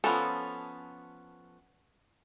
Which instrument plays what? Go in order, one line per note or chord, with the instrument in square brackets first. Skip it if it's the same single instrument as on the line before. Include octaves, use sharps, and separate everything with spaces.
[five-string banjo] F3 A#3 B3 C#4 A4